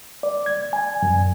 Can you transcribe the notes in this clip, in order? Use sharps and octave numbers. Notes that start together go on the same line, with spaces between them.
D5
G#6
G#5
F#2